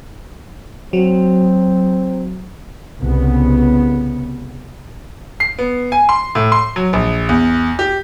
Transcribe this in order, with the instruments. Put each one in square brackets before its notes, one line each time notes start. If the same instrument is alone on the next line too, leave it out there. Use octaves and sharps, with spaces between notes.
[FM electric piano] F#3 [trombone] C4
[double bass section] C2 C#3 B3
[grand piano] C7
B3
G#5
C6
A2
C6
F#3
A#1
E2
G4